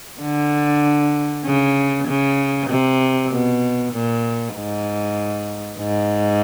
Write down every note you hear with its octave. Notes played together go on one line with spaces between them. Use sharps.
D3
C#3
C#3
C3
B2
A#2
G#2
G#2